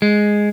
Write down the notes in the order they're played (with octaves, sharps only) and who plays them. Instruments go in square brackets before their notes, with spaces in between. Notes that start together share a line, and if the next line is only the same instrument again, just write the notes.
[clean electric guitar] G#3